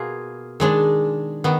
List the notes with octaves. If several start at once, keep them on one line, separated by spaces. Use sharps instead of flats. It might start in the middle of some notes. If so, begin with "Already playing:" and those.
Already playing: B2 A#3 F4 G#4
D#3 G#3 D4
D#3 B3